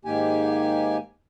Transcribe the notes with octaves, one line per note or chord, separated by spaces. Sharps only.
G#2 D#3 A#3 G4 G#5